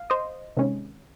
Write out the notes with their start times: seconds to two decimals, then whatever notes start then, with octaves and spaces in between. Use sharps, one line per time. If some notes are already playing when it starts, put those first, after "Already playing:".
Already playing: F5
0.10 C5 D#5
0.57 C3 D#3 G#3 C#4